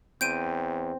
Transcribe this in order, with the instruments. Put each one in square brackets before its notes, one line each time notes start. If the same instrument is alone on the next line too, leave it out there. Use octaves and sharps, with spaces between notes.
[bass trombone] E2 [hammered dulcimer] C4 [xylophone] G6 D7 D#7